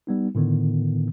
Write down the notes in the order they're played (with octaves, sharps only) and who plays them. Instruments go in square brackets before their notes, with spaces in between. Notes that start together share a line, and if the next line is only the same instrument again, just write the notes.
[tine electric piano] G3 B3 D#4
A2 D3 D#3 B3